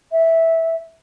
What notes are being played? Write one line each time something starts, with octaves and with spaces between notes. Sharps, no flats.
E5